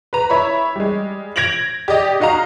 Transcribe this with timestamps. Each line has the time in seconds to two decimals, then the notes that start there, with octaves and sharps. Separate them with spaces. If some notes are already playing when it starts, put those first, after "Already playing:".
0.13 B4 A#5
0.30 E4 C#5 B5
0.76 G3 G#3
1.36 G#6 A#6 D7 F7 F#7
1.88 G4 D5 D#5
2.20 D#4 F#4 D#5 F5 A#5